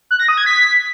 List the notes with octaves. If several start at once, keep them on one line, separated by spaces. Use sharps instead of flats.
F#6
A#6
D#6
G#6
B6